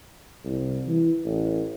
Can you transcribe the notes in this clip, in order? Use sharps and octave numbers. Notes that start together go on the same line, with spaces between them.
C2
E3
A1